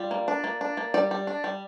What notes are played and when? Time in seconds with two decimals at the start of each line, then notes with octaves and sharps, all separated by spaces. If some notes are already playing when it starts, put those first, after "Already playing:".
Already playing: G3 F4
0.11 A#3
0.28 D4
0.44 A#3
0.61 D4
0.77 A#3
0.94 G3 D5
1.11 G3
1.27 D4
1.44 G3